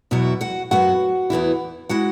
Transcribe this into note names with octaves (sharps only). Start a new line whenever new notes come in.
E2 B2 F#3 E4 E5
F#4 F#5
F#2 F#3 B3 F#4 F#5
E2 E3 B3 E4
G#3 E4 F#4 F#5